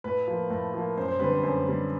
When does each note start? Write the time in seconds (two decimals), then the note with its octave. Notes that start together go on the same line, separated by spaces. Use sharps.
0.04 A2 B4
0.28 F3 A#3
0.50 A2
0.74 F3 A#3
0.97 F#2 C5
1.08 C5
1.20 D3 G3 C4 B4
1.32 C5
1.43 F#2 C5
1.67 D3 G3 C4